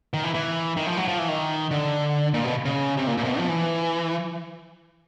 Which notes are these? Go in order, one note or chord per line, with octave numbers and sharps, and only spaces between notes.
D#3
E3
E3
D#3
F3
F#3
F3
E3
D#3
D3
A#2
B2
C#3
C3
A#2
A#2
C3
B2
F3
E3